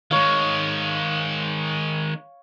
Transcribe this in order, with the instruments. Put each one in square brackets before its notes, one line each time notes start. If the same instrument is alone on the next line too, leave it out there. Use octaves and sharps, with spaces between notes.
[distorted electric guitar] D#3 G#3 [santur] C#5 F5